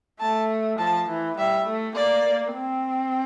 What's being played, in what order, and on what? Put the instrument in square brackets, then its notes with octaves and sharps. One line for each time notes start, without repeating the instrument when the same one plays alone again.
[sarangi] A3 [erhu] A5
[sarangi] F3 [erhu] A5
[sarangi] E3
[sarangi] G3 [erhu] E5
[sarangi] A3
[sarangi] A#3 [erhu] D5
[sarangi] C4